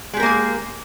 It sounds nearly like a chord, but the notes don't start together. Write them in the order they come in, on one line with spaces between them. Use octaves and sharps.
G#3 G4 A#4 A#3 G#4